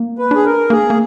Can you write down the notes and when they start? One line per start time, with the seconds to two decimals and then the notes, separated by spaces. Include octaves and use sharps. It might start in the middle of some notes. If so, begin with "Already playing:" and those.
Already playing: A#3
0.18 B4
0.31 D4 G#4
0.45 A#4
0.70 A#3 G#4
0.90 A#3